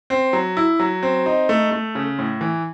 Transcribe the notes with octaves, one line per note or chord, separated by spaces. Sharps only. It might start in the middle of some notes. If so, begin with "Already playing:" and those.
C4
F#3
E4
F#3
C4
D#4
A3
A3
C#3
A2
E3